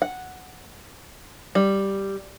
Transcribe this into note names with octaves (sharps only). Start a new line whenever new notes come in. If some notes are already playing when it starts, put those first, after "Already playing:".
F#5
G3